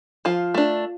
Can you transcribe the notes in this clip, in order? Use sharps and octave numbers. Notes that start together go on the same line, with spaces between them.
F3 F4
A3 D4